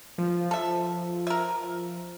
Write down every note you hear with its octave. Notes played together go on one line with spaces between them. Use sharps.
F3
A4 E5
A#4 E5